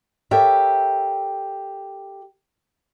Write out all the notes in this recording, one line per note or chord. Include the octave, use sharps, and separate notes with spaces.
G4 A4 A#4 C#5 E5